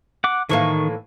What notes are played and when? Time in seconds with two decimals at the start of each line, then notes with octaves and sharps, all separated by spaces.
0.24 F#5 D6
0.49 A2 D#3 E3 A#3 C#6